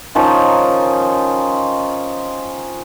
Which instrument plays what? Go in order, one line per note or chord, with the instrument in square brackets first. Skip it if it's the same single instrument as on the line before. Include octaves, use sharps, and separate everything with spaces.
[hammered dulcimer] D#3 F3 C#4 D#4